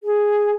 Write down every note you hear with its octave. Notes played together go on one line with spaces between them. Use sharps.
G#4